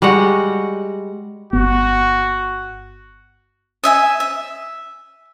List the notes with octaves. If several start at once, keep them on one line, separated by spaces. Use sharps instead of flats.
G3 G#3 F#4 F#5
G1 B3 F#4
D#5 E5 G#5
E5